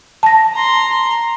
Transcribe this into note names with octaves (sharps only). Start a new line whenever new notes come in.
A5 A#6
A#5 C6